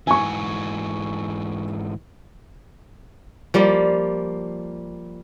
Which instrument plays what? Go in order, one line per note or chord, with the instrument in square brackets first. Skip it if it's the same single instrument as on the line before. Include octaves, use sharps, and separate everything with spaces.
[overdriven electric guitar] G#2 E3 [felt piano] G#5 C#6
[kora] F3 G3 A#3